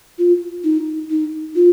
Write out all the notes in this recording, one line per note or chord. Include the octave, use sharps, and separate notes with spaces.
F4
D#4
D#4
F4